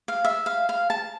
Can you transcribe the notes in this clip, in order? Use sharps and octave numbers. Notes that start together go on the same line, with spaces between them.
F5
E5
F5
F5
A5